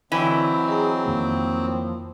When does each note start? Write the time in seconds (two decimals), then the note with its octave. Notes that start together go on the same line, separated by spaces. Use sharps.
0.12 D3 E3 F#3 C4 D#5 G#5 B5
0.68 G#4 D#5 A#5
1.05 F2 D#3 F3 A#3